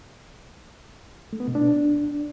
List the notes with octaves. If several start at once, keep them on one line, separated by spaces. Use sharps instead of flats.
A3
B3
B2
D4